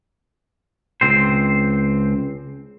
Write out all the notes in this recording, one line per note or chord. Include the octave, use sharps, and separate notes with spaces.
C#2 C4 C5